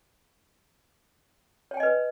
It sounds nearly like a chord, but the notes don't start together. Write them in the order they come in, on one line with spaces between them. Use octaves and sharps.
C#5 G5 G#5 D#5 B4